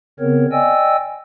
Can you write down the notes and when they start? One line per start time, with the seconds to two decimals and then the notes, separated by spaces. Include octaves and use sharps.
0.20 C#3 B3 C4 A#4 C#5
0.52 D5 D#5 G5 G#5 E6